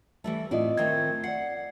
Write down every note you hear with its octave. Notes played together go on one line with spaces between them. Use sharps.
E3 G3 A3
A2 C4 E4 F4 D5 D#5
D#3 A3 C4 G#6
D5 F#5 C7